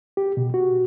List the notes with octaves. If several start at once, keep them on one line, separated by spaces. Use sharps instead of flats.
G4
B2
F#4